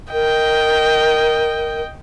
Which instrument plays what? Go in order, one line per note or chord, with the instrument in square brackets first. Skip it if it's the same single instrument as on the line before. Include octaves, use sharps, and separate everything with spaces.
[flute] A#4 [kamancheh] D#5 G5